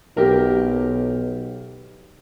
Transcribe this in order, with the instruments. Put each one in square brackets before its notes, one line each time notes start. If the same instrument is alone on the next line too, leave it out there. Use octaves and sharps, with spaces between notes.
[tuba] B1 [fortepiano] G4 A#4